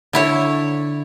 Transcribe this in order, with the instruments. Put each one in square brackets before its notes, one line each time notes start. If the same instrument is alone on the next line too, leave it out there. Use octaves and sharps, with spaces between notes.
[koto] D3 E4 C#5